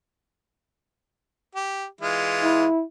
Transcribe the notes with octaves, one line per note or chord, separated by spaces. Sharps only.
G4
E3 G#3 F4
E4